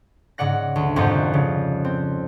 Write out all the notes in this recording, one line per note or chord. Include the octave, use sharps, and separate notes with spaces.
G#2 C#3 D5 F#5 A#6
D2
C2 F2 G#2 F3 G4
C#3
C4